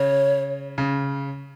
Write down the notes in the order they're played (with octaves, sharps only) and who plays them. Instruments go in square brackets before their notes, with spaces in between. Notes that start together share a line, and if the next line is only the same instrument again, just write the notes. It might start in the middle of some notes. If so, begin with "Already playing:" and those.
Already playing: [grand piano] C#3 [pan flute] C#5
[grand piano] C#3